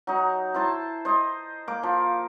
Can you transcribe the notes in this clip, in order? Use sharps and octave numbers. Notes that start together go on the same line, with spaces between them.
F#3 D#4
E4 C5 A5
C5 D#5
A#3 D6
F3